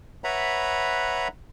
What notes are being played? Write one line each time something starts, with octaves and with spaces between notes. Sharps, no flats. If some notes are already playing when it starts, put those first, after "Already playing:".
B4 C#5 E5 F#5 A#5 B5